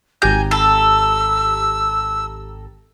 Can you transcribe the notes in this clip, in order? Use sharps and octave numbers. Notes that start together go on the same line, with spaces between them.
G#1 G4 G#5 A#5 G6
A4 A5 E6